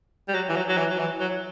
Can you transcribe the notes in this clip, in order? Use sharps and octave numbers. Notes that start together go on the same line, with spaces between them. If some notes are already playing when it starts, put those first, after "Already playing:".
G3
F#3
E3
F#3
F#3
E3
F#3
E3
F#3